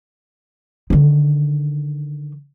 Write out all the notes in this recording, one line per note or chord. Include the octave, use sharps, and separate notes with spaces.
D3 D#3